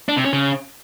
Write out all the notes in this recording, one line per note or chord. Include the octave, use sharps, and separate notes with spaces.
D4
C3
C#4
C#3